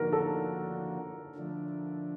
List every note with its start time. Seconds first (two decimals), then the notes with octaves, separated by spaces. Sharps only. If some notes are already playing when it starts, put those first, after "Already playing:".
Already playing: D3 F3 A#3 D4 F#4 A#4
0.13 A4
1.35 D3 F3 A3 D4